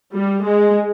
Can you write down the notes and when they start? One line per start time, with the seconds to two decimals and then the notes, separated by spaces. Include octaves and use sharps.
0.14 G3
0.44 G#3